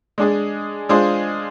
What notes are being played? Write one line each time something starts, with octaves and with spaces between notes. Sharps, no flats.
G#3 D4 G#4
G#3 D4 F4 G#4 C5